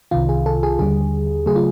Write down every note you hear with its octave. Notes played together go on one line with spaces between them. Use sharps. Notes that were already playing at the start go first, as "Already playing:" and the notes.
C2 C3 D#3 F4
G#4
A4
G#4
D#2 D3 G3 G#4
C#3 F#3 A3 G#4
F4